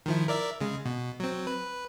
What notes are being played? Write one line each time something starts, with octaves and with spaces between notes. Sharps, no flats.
D#3 F3 E4
A#4 D5 E5
C#3 G#3
B2
F#3 C4
B4